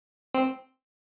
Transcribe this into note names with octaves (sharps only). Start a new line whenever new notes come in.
C4